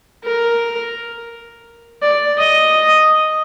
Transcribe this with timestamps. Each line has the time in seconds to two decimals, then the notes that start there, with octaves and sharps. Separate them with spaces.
0.24 A#4
2.02 D5
2.38 D#5